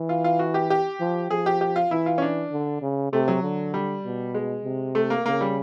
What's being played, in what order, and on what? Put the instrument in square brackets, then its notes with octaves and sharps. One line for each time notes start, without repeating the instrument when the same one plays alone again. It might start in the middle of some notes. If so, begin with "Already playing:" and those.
Already playing: [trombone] E3
[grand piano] F4
F4
F#4
G4
G4
[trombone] F3
[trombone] F3 [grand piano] G#4
[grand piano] G4
G4
F4
[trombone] E3 [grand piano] E4
[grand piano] F4
C#4
D4
[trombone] D3
C#3
[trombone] C3 [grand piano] A3
[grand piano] F#3
[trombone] D3
[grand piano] G3
[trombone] B2
[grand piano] G#3
[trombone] C3
[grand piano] A3
A#3
[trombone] C#3 [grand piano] A#3
[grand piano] G3